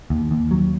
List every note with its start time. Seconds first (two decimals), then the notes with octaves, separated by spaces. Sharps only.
0.10 D#2
0.31 D#2
0.51 F#3